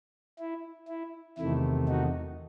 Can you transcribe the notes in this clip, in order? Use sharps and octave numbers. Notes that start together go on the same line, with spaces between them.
E4
E4
E2 C3 D#3 A3 E4
D#4 F#4